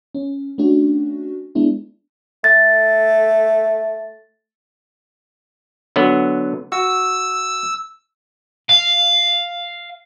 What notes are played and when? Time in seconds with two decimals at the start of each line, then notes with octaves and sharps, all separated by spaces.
0.15 C#4
0.58 A3 C#4 D4 F#4
1.55 G#3 B3 D4 E4
2.44 A3 A6
5.96 D3 F#3 B3
6.72 F#4 E6
8.69 F5